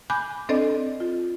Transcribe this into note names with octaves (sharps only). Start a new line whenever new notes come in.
G#5 B5 D6 F#6 G6
C4 D4 A4 C5 D5 D#5
F4